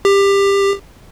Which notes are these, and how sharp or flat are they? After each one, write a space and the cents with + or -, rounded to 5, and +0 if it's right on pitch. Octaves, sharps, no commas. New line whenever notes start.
G4 +20